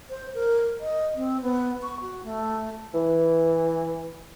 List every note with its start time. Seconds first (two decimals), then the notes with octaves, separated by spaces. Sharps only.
0.10 C5
0.34 A#4
0.80 D#5
1.16 C4
1.42 B3
1.82 C#6
2.01 F#4
2.24 A3
2.93 E3